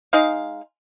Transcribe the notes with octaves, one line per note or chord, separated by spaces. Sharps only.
G#3 D#4 F5